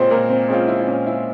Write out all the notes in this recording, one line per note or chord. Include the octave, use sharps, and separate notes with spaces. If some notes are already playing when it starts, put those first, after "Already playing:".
Already playing: A#2 G#3 C4 F4 C5 C#5
A#2 A#4
C4
G#3 C4 C#4 F4
E4
E4
A#2 C#4
E4